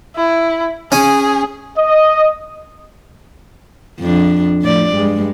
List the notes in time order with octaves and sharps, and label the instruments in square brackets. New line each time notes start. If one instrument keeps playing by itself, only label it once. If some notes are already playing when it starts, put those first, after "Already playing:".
[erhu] E4
[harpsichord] C#4 G#5 [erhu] G#4
[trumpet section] D#5
[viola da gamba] F2 D4
A2 F3 D5
G2 G#3